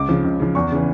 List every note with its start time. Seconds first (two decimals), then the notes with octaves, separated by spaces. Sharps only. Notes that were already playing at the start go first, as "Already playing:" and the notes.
Already playing: C#2 D6
0.09 C#3 F3
0.25 C#2
0.40 C#3 F3
0.55 E2 C#6
0.72 C#3 E3